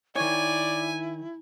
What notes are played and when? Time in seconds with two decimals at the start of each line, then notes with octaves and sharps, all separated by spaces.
0.16 D#3 E4 C#5 D5 G#5